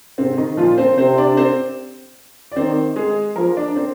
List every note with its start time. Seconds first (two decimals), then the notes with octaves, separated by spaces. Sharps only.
0.18 G#2 C3 C4
0.37 D#3 D#4
0.57 A#2 F3 F4
0.78 C4 C5
0.97 C3 C4 C5
1.18 D4 D5
1.37 C4 C5
2.52 D5
2.56 D#3 C4 C5
2.96 G#3 G#4
3.36 F3 A#3 A#4
3.57 D4 D5
3.76 C4 C5